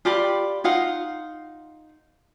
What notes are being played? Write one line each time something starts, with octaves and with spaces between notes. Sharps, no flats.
F4 G4 D5 B5
D#4 F4 F5 F#5